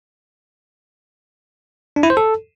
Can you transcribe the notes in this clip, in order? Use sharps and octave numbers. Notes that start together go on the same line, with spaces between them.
D4
E4
C5
A4